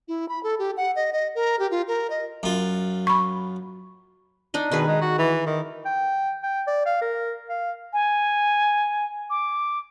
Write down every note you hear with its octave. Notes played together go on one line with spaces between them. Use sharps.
E4
B5
A4
G4
F#5
D#5
D#5
A#4
G4
F4
A#4
D#5
F#2 F4
B5 C#6
D4 D#4 D#5
B2 D#3 G#4 B4
G#3
F#4
E3
D#3
G5
G5
D5
F5
A#4
F5
G#5
D6